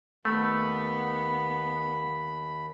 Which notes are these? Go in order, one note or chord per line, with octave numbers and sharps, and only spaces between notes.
D#2 A3 B3 B5